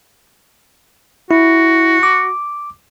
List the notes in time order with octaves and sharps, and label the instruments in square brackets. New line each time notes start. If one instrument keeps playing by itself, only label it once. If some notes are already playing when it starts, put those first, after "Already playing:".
[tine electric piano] E4 [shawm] F#4
[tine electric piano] D6